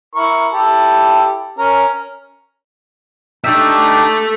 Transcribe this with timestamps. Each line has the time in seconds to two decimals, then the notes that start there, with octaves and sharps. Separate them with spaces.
0.15 E4 A#4 C#6
0.52 E4 G4 A4
1.59 C#4 A#4
3.44 D4 D#4 G4 A4 E5